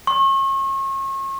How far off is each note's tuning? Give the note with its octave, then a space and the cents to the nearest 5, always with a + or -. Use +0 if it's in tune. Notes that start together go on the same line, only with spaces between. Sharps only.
C#6 -40